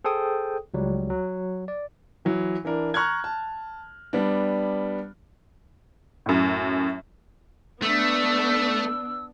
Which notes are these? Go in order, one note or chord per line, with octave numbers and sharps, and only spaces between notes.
G#4 A4 C5 G5 D#6
C#2 F#3 G3
F#3
D5
E3 F#3
E3 D4 A#4
A#5 C#6 F6 F#6 G#6
A5
G3 B3 D4
F#2 A2
A3 B3 D4 E6